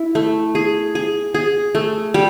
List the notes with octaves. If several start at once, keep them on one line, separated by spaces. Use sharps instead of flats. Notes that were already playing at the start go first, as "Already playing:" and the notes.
Already playing: E4
A3
G#4
G#4
G#4
A3
G3